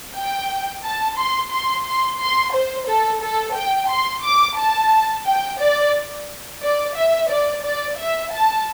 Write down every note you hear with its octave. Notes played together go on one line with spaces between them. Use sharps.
G5
A5
C6
C6
C6
C6
C5
A4
A4
G5
C6
D6
A5
G5
D5
D5
E5
D5
D5
E5
A5